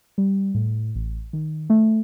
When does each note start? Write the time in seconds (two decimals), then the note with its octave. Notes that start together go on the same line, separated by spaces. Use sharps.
0.18 G3
0.54 A2
0.95 A1
1.33 D#3
1.70 A3